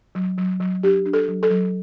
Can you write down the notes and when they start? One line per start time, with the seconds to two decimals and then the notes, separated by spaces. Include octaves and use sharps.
0.15 F#3
0.38 F#3
0.60 F#3
0.83 D4 G4
1.06 D4
1.13 A4
1.28 F#3
1.43 A4
1.51 F#3